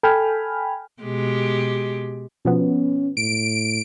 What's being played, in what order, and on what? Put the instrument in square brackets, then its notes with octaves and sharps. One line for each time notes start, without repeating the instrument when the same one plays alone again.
[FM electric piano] A4 G5 G#5 B5 F6
[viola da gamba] B2 G#3 G4
[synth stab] B2 F3 B3 [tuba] C#4
[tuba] A2 [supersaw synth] D7